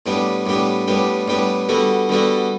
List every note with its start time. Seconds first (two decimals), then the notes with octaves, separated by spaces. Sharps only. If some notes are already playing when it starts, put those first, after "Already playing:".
0.06 A2 G3 B3 D4 G4
0.46 A2 G3 B3 D4 G4
0.88 A2 G3 B3 D4 G4
1.28 A2 G3 B3 D4 G4
1.69 D3 G3 B3 F#4 A4
2.09 D3 G3 B3 F#4 A4